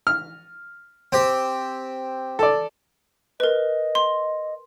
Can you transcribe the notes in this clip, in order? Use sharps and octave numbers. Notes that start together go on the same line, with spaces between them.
F6
C4 G4
A4 D5
A#4 B4 D#5
C6